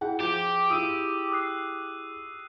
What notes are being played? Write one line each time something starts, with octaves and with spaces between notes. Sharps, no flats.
E4 G#4 F#5 G5
F3 G4
E4 F4 D#6 E6 D#7
D#6 F#6 C7